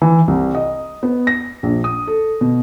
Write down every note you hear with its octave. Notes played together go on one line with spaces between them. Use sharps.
E3
C2
D#5
B3
A#6
A#1
D#6
A4
B2